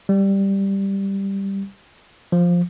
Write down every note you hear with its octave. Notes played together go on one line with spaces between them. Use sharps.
G3
F3